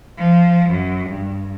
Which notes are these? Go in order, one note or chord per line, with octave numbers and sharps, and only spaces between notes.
F3
F#2
G2